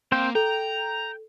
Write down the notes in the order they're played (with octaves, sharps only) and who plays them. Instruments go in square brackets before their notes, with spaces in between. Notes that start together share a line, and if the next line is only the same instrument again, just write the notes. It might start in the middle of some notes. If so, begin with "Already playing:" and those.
[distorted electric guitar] A#3 [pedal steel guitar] C4 C5 G5
[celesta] A4 [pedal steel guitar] G5 [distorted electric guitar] A#5